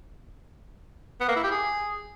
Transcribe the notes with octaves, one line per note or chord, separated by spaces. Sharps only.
B3
A#3
E4
G4
G#4